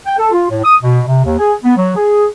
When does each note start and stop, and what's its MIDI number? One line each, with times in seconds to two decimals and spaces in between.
0.06 0.15 79
0.18 0.31 69
0.32 0.47 65
0.50 0.58 45
0.64 0.76 87
0.83 1.01 47
1.08 1.25 48
1.25 1.36 39
1.39 1.54 68
1.64 1.75 59
1.77 1.94 54
1.96 2.25 68